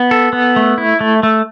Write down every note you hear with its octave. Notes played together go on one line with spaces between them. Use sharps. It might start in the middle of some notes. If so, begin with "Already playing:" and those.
Already playing: B3
A4
B3
A3
E4
A3
A3